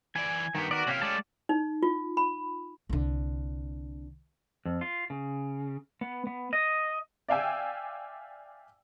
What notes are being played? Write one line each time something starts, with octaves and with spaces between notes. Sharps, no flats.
E3 D5 G#5
G2 D#3 B3 G4
F#4 A#4 D5
C3 A#3 C#4 G4 F5
G#3 A3 D5 A5
D#4
F4
B5
C2 D3
F2
F4
C#3
B3
B3
D#5
D5 E5 F5 G5 G#5 E6